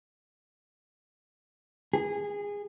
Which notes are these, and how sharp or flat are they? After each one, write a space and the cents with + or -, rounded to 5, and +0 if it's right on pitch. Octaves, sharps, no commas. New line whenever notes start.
G#4 -20